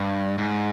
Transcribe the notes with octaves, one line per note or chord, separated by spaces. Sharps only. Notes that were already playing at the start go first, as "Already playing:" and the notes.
Already playing: G2
G#2